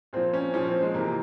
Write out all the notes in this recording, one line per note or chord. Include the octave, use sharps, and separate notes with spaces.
A#2 F3 C4
C#4
A#2 F3 C#4
C4
G#3
C3 E3 A#3